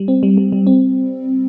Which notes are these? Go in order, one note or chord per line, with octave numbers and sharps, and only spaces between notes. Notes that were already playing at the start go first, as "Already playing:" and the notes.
Already playing: G3
C4
G3
G3
G3
C4